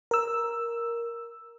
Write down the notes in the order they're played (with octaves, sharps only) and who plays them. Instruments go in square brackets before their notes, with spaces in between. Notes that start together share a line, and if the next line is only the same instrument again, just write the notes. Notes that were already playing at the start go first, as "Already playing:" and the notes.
[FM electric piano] A#4 E6